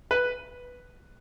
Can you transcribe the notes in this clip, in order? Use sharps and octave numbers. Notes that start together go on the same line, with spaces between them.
B4